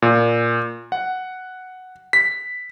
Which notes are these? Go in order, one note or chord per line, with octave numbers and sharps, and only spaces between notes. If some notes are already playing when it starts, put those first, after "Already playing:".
A#2
F#5
B6